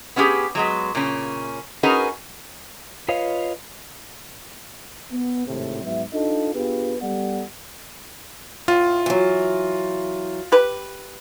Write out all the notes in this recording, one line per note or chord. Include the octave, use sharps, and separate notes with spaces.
B3 C#4 E4 F4 G4 G#4
F#3 G#3 B3
A#2 C#3 C#4
C#4 D#4 F#4 G#4 A#4 B4
F4 B4 C#5 D#5 F5
B3
G#1 A2 C3
G#2 F#3 B3 E5
D4 D#4 F4 A4 D#5
B3 D4 F4 G4 G#4 B4
G3 B3 G4 A4 D5 F#5
A2 F4
E3 F#3
G4 B4